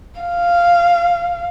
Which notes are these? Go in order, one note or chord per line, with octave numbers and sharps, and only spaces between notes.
F5